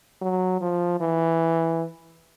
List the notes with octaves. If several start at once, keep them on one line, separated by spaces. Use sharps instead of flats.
F#3
F3
E3